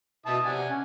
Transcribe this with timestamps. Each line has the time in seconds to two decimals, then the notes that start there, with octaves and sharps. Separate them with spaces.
0.26 B2 E4 A5 D#6
0.45 C3 D5 F#5 G#5
0.69 C#4